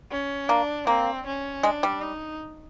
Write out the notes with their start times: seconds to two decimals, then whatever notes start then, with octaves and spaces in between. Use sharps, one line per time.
0.11 C#4
0.49 A#3 D4
0.87 A#3 C4
1.26 C#4
1.63 G#3 D4
1.83 G3
2.02 D#4